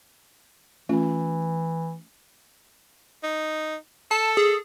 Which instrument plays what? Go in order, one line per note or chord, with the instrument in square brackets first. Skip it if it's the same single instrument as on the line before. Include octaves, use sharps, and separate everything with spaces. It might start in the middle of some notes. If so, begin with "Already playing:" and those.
[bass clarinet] E3 [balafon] A3 C#4 F4
[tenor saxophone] D#4
[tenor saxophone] A4 [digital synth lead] A5
[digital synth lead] G#4